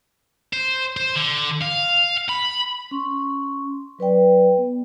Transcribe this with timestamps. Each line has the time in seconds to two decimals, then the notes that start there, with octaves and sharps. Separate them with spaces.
0.53 C5
0.97 C5
1.15 D3
1.61 F5
2.29 B5
2.91 C#4 C6 C#6
3.99 F#3 B4 D5 G5
4.58 B3